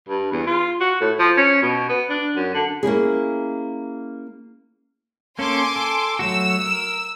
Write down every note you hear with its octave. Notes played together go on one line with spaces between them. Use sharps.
G2
E2
F4
F#4
A2
F3
C#4
B2
B3
D4
F#2
D3
A#3 C#4 E4 G#4
A#3 C#4 A4 G#5 C6 D6
A4
F#3 A3 F#4 E6
A#4